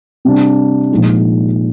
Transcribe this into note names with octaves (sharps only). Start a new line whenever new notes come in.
C3 G3 D4
A#2 F3 G#3 D#4